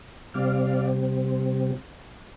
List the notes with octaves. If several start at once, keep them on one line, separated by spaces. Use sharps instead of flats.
C3 G3 C4 D5 F5